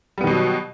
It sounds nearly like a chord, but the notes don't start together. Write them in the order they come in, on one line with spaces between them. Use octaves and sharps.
G3 B3 D#3 B2 F#3